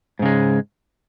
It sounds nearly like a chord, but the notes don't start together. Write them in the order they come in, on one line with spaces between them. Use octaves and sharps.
G#2 C#3 G#3